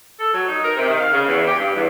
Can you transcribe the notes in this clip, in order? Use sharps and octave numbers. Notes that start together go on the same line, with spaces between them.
A4
F#3
D#4
A#4
C3
D#3
F5
C#3
E2
G4
G2
E2